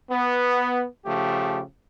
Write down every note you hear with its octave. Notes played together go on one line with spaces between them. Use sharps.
B3
C#3 F3 A3 G4